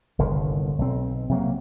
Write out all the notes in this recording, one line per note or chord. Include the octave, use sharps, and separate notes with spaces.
G1 C2 D3 D#3
B1 C4
C3 F#3 A#3